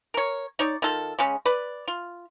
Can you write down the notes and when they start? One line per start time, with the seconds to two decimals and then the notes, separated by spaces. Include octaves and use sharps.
0.14 A#4 C#5
0.59 D#4 C#5 D5
0.82 D#3 F4 A4
1.19 C#3 G#3 C#4
1.45 B4 D5
1.88 F4